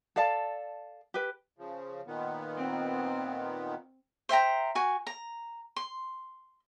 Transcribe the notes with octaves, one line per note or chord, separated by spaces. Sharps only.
A4 D5 F5 A5
G4 B4
C#3 F3
A#2 D#3 B3
C4
C5 E5 G5 A#5
F#4 G#5
A#5
C6